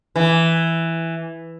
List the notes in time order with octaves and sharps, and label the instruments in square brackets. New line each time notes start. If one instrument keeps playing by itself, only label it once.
[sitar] E3